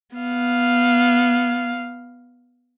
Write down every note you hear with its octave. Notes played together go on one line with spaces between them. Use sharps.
B3 F5